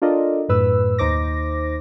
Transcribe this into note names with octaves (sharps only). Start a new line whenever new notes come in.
D4 F4 A4 A#4 D5 D#5
F#2 A2 B4 E6
D#2 D#4 C5 D6 A#6